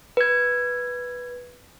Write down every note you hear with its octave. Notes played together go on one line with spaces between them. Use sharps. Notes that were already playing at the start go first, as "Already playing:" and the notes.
B4 G#6